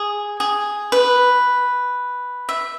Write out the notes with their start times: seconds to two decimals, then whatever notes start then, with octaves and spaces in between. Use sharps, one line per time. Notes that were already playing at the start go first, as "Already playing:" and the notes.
Already playing: G#4
0.40 G#4
0.92 B4
2.49 E5